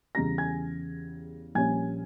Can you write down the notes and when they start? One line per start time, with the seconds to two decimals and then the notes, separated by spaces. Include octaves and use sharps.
0.15 E2 C#3 G3 A#5 A#6
0.38 G#5 G#6
1.55 A#1 A#2 G3 C#4 G#5 G#6